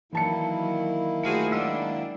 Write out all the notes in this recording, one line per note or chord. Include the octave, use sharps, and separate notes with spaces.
D#3 E3 F#3 A#3 E4 A5 C#7
A3 F4 F#4 G#4 C5 C6
F#3 G#3 D4 D#5 E6